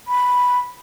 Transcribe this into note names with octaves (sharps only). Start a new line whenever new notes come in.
B5